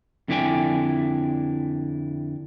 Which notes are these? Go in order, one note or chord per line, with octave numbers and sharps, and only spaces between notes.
F2 D3 E4 D5 G5 G#5